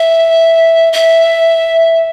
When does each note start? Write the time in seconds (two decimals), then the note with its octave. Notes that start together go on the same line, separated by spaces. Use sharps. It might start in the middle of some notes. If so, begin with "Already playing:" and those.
Already playing: E5
0.93 E5